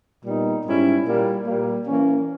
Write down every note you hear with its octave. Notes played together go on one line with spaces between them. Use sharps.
A#2 G3 B3 D#4
G#2 G3 C#4 E4
A#2 G3 A#3
A#2 G3 A#3
E3 A#3 C#4